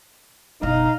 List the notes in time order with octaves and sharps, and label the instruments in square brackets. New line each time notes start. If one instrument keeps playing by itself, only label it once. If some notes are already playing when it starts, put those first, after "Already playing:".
[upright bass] F#1 B2 [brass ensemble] D#4 [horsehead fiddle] D#5 F5